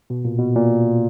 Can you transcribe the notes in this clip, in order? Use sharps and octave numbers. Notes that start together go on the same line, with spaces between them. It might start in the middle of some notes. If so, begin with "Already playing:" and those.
B2
A#2
B2
A#2